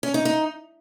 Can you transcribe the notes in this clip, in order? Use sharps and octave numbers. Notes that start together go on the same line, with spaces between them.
C#4
D#4
D#4